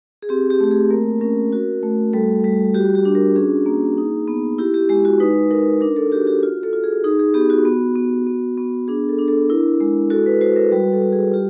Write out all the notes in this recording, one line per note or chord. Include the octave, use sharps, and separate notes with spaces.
G#4
C4 G4
G4
A3 G4
G#4
A#3 A#4
C#4 A#4
F#4
A3
G3 A4
G3
F#4 G4
G4
D4
A#4
C#4 G#4
A#3
D#4
B3
E4 G4
G4
G#3 G4
F#4
D#4 B4
D#4 A#4
D4 A#4
A4
F#4 G4
G4
F4
A4
F4
G#4
D#4 G#4
G#4
B3 G4
F#4
B3
B3
B3
B3
D4 G#4
A4
D4
A4
E4 A#4
G#3
F#4 A4
B4
F#4 C5
A#4
G3 B4
A4
G3
G#4
F4 G4